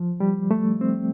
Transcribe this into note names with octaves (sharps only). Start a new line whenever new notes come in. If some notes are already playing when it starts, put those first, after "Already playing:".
Already playing: F3
G3
A3
C4